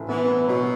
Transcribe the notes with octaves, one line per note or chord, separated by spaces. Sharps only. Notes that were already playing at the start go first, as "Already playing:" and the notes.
Already playing: A1
E3 B3
B3
B2 F#3